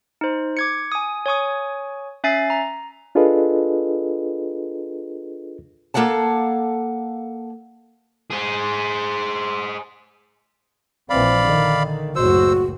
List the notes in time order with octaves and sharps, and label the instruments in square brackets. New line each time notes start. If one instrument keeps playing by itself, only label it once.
[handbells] D#4 C5
D6 G#6 C#7
G#5 D#6
C#5 G#5 C#6 D#6
C#4 E5 G#5 A6 C7
A#5
[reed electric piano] D4 F4 G#4 A4 B4 D#5
[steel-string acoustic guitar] A#3 A4 F5 F#5 A5
[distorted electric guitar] G#4 C5
[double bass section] A#1 E3 C4 [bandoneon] D5 F5 B5
[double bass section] D3 D#3
[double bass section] F#1 C#2 A2 [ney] F#4 [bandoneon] C5 E6